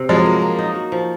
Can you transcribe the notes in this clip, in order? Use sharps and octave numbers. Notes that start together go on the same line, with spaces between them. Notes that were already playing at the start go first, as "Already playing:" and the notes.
Already playing: C3
F3 F#3 G#3
A#3
A#3
D#4
F#4
F3